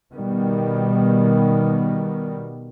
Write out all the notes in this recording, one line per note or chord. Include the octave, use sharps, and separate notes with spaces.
B2 D#3 G3 B3